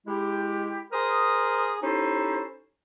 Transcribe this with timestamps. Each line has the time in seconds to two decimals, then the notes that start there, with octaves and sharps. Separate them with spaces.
0.07 G#3 E4 G4
0.92 G#4 A#4 C5 A#5 D#6
1.82 C#4 D#4 E4 G4 A4 C5